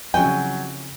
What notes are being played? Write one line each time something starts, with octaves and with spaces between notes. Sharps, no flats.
F2 C#3 F#3 E4 F#4 G5 G#5